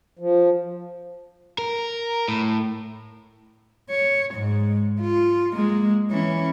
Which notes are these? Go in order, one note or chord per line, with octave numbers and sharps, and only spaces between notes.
F3
A#4
A2
C#5
G#2 G#3
F4
G#3 A#3
E3 C#4